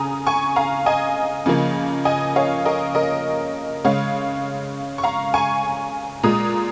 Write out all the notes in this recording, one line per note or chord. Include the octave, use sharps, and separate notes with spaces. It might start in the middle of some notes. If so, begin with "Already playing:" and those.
Already playing: C#3 G#5 A#5 D#6
G#5 C#6
F5 A#5
D#5 G#5
C#3 F3 A#3
D#5 G#5
C#5 F5
A#4 D#5
A#4 D#5
C#3 G#3 C#5 F5
C#6
F5 A#5
G#5 C#6
A#2 G#3 A#5 D#6